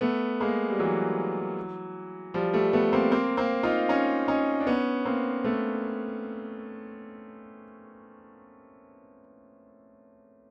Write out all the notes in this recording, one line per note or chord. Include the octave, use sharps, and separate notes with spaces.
A3 B3
G#3 A#3
G3
E3 F#3
F3 G3
G3 A3
A3 B3
A#3 C4
A#3 C4
A#3 C4
D#4 F4
C#4 D#4
C#4 D#4
D4
B3 C#4
A#3 C4
A3 B3